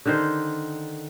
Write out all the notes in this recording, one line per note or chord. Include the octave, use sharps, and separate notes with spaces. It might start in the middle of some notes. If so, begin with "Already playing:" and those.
D3 D#3 C5